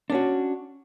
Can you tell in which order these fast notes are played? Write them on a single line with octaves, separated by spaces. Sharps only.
D4 C#4 F#4